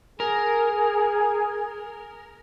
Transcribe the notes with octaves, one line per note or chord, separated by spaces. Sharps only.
G#4 A#4